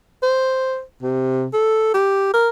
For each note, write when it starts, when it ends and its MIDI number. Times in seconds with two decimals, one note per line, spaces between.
0.23 0.82 72
1.03 1.46 48
1.53 1.93 69
1.94 2.29 67
2.33 2.49 70